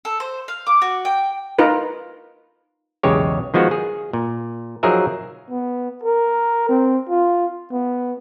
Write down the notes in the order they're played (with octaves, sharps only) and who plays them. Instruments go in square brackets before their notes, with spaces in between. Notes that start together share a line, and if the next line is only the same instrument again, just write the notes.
[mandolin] A4
C5
F5
D6
F#4
G5
[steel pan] D#4 F4 A#4 B4
[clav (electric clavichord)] B1 E2 C#3 G#3 G4 C#5
D#3 F3 G#3 B3 F#4
G#4
A#2
F3 F#3 D#4 G#4 A#4 E5
[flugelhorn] B3
A#4
C4
F4
B3